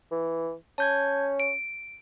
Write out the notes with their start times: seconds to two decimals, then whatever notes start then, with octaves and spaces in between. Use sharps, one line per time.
0.11 E3
0.78 C#4 A5 G6 G#6
1.40 D7